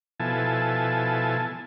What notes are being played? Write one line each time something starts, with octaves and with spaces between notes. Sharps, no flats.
B2 F3 E4 A4 G#5 A5